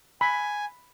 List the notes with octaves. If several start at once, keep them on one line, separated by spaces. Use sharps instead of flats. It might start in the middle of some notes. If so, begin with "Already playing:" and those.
G#5 B5